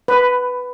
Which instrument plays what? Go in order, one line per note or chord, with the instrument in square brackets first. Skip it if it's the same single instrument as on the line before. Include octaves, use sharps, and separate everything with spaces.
[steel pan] B4